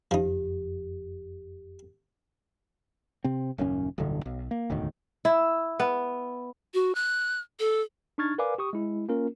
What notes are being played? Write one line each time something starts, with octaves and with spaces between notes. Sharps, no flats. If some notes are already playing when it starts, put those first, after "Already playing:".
F#1 F2 F3 D#4 G4
C3 C4
D#1 F#2 C#3 C#4
D1 B1 G2 D3
B1
A#3
E1 D2 A2 D#3
E4
B3
F#4
F#6
A4
D4 D#4 C#6 F6 G#6 A6
A#4 B4 D5 F5 G#5 D6
G4 C#6 D#6
G#3 E4
A#3 C#4 F4 A#4